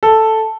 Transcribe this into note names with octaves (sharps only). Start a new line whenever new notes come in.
A4